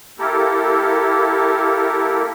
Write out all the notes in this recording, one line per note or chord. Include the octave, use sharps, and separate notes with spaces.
A#3 E4 G4 A4 A#4